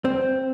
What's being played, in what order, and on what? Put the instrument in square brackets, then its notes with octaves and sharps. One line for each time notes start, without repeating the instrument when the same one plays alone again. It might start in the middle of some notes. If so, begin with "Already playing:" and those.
[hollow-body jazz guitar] C4